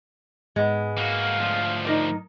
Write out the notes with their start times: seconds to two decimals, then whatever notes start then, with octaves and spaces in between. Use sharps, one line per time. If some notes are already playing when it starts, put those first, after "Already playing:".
0.56 G#2 G#3 B3
0.97 A#3 F#4 F5
1.40 D2 F3
1.85 D#4 A#4 D5